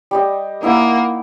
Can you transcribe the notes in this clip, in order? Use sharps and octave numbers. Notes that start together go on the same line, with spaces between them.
G3 G4 D#5
A#3 D#4 E4 F#5